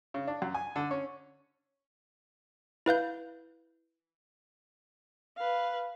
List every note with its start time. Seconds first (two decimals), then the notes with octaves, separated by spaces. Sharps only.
0.14 C#3
0.27 D4
0.42 F#2
0.55 G#5
0.76 D3
0.91 C#4
2.86 E4 B4 F5 G6
5.37 B4 F5